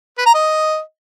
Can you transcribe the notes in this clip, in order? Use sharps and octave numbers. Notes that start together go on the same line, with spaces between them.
B4
A#5
D#5